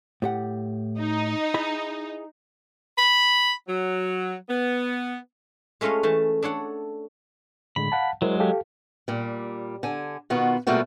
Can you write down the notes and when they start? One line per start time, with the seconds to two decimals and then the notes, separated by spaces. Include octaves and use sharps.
0.22 A2 G4 F#5
1.00 D#4
1.54 E4 G#4 B5
2.97 B5
3.68 F#3
4.49 B3
5.81 G#3 A3 C#4 F4 D#5 F5
6.03 E3 A3 A5
6.42 D4 A4 C#5 F#5
7.76 A2 D3 G#3 B5
7.92 F5 F#5 A5
8.22 F#3 G#3 E4 A#4 C5
8.40 G4 A4 F5
9.08 A#2 G3
9.83 D3 G#5
10.30 B2 D#3 B3 F4 F#4
10.67 B2 G3 A3 A#3 F4 F#4